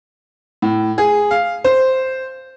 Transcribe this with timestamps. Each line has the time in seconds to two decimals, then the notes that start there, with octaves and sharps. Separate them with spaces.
0.62 A2
0.98 G#4
1.31 F5
1.64 C5